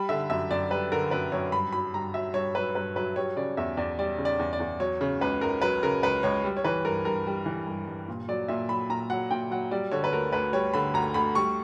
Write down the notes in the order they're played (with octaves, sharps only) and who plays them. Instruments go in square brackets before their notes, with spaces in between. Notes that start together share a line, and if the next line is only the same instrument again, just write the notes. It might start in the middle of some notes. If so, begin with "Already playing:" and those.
Already playing: [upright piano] G3 B5
D3 E5
F#2 E5
F#2 D5
G3 B4
D3 A#4
F#2 B4
F#2 C#5
G2 B5
F#3 B5
G2 A#5
F#3 E5
G2 C#5
F#3 B4
G2 B4
F#3 B4
G3 C#5
C#3 D5
E2 E5
E2 D5
G3 D5
C#3
D5
E2
D5
E2
F#3 C#5
C#3
C#2 B4
C#2 A#4
F#3 B4
C#3 A#4
C#2 B4
C#2 C#5
G3
C#5
E3 B4
G2 A#4
G2 A#4
G3
E3
G2
G2
A#2
F#3 D5
A#2 E5
F#3 B5
A#2 A#5
F#3 F#5
A#2 G5
F#3 F#5
G3 D5
D3 C#5
B4
D2 A#4
D2 B4
G3 C#5
D3 B5
D2 A#5
D2 B5
G3 C#6